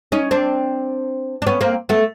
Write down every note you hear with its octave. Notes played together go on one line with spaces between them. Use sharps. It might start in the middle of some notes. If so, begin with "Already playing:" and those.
C#4 D#4
C4 D4
D4
B3 C#4
A#3 C4
A3 B3